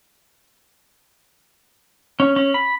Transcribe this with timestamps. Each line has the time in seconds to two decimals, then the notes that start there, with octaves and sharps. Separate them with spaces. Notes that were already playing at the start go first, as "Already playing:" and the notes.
2.20 C#4
2.36 C#4
2.54 B5